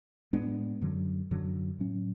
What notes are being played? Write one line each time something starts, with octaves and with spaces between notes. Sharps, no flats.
A2 G#3 B3 D4
F#2 D3 F#3
F#2 D3 F#3
A2 F#3 C#4